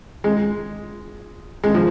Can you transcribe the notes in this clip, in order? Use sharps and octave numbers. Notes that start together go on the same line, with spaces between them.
G#3
G#3
F3